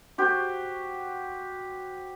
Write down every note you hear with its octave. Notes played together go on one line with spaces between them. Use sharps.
F#4 G4 C5